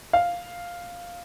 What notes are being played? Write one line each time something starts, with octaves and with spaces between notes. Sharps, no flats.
F5